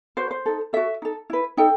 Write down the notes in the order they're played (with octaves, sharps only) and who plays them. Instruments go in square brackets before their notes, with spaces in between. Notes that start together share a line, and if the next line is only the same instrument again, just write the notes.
[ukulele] F#4 B4 C5
C5
D#4 A4
F#4 A4 E5
D#4 A4
E4 B4
D#4 A4 G5